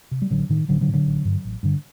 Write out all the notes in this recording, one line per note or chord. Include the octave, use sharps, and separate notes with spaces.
C3
G3
A1 D3 F#3
A2 D#3
A1 D3 F#3
D3 F#3
A2
D3 F#3
A1
G2 D3
A1
G2 D3